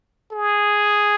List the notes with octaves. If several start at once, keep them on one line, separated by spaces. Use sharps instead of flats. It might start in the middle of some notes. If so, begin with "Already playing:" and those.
G#4